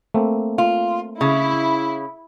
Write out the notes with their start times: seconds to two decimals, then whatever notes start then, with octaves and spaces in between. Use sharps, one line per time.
0.14 A3 A#3 C4
0.58 F4
1.21 C#3 E4